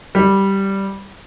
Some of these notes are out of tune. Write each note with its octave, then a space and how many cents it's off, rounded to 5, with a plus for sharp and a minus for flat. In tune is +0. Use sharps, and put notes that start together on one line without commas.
G3 -5